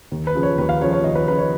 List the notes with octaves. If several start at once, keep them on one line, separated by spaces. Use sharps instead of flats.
D#2
B4
C#3 F3
C#5
D#2 B4
F5
C#3 F3 C#5
C#5
D#2 D#5
B4
C#3 F3 B4
C#5